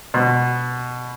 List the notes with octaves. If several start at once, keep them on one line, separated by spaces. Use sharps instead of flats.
B2